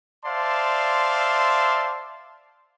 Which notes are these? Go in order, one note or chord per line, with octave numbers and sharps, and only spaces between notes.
C5 D5 E5 F5 A5 C6